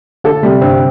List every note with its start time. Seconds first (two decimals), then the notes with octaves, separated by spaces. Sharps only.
0.24 D3 A4
0.43 C3 G3
0.61 G2 C4